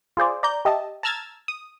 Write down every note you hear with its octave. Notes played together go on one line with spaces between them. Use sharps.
F4 G#4 C5 D5
D5 A#5 G6
G4 D#5 E5 A5
A5 A#5 E6 F6 G#6 A6
D#6